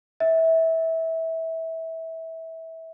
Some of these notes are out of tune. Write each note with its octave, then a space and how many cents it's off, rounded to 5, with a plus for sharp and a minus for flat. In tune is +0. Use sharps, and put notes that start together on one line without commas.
E5 -20